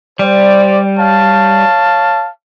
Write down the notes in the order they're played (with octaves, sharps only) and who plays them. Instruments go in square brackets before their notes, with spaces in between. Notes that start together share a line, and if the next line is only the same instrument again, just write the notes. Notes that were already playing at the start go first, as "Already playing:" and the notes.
[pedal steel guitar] G3 [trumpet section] C5 D5
[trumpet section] C#5 F5 A5